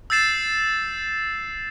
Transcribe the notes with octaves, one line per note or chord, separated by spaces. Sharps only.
E6 G6 A6 C7 E7